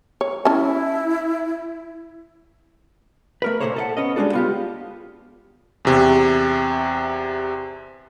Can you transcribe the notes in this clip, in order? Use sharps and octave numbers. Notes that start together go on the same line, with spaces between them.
C#5
C#4 E4 A5
A3 A#4 B4
A#2 G3 A#3 A4 C5 C#5
A4 D#5 F#5
B3 C#4 D#5
G3 G#3 B3 D4 F#4 A4
B3 F4 G4
E2 C3